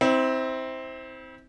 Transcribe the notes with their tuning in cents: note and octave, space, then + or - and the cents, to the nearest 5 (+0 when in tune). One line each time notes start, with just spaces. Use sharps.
C4 +0 E4 -35